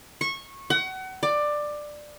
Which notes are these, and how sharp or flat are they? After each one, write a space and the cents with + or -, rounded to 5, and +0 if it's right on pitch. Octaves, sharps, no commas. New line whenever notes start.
C#6 -20
F#5 +30
D5 +15